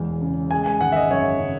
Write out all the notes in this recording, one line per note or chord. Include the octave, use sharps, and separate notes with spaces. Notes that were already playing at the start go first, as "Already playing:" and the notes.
Already playing: E1 E2 G#3
C#3
G#3 G#5
G#5
G#1 F#5
E5
D#5
F#2 C#5
C#3